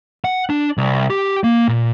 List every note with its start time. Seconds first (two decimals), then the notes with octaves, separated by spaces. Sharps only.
0.25 F#5
0.50 D4
0.78 C2
1.10 G4
1.44 A#3
1.68 A#2